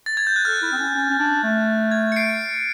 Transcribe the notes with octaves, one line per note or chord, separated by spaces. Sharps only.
A6
G#6
G6
F#6
A4 F6
E4
C4
C#4
C#4
C#4
D4
A3
G#6
C#7
C7 D7